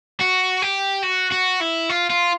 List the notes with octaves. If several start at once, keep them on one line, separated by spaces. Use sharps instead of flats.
F#4
G4
F#4
F#4
E4
F4
F4